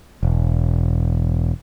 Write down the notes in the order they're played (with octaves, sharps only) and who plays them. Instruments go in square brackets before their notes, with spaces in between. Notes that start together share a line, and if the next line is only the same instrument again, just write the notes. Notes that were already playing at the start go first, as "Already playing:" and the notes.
[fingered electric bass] E1